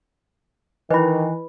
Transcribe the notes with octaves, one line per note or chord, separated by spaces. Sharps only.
D#3 E3 E4 B4 D#5 B5